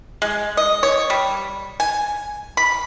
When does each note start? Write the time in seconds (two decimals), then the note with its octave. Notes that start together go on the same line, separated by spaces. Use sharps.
0.22 G#3
0.57 D#5
0.83 C#5
1.10 G3
1.80 G#5
2.57 B5